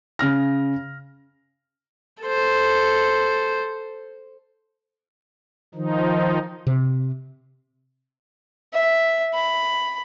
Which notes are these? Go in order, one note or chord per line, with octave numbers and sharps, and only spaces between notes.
C#3 F6 A#6
A4 C5
D#3 F3 D#4
C3
E5
B5